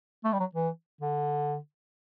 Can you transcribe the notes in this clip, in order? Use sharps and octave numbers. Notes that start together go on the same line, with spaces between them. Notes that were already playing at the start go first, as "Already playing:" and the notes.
A3
G3
F#3
E3
D3